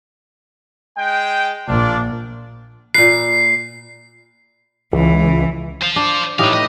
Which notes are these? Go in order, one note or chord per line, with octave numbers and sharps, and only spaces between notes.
G#3 G5
A#1 D4 F4 D5
A#2 B4 C7
C#2 E3
C5 F5
D4
A2 D#4 G4 B4 F5
B4 D#5